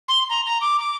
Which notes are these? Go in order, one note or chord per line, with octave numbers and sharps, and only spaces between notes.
C6
A#5
A#5
D6
D6